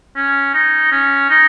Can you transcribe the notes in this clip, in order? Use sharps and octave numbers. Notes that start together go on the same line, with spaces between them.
C#4
D#4
C#4
D#4